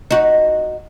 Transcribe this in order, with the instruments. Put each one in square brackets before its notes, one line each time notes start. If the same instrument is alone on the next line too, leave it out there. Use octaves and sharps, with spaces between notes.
[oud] D#4 F#4